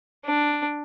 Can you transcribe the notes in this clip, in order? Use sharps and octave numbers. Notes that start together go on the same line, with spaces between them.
D4